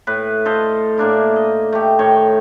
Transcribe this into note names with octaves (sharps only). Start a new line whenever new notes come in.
A2 B4
A4 C5 D#5 F5
A2 A#3 D4 E4
D#5
A3 G4
A2 D#3 C#5 G5